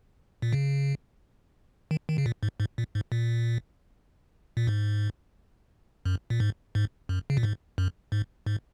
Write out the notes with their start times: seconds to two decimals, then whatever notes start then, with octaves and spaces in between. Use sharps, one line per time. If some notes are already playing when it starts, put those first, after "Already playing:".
0.42 A#2
0.53 C#3
1.91 D#3
2.09 D#3
2.18 C#3
2.26 A#2
2.43 G#2
2.60 G#2
2.78 A#2
2.95 G#2
3.12 A#2
4.57 A#2
4.67 G#2
6.05 F#2
6.30 A#2
6.40 G#2
6.75 G#2
7.09 F#2
7.30 C#3
7.37 A#2
7.43 G#2
7.78 F#2
8.12 G#2
8.47 G#2